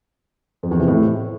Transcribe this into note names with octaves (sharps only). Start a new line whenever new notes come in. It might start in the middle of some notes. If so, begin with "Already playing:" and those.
F2
E2
C3
A2